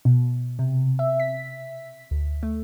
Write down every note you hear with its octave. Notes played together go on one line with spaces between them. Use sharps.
B2
C3
E5
B6
D2
A3